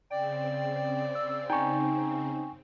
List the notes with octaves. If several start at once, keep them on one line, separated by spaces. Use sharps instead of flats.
C#3 C4 D5 G5
E6
D#4 G5 G#5 C#6